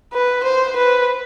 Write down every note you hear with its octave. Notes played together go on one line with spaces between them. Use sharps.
B4
C5
B4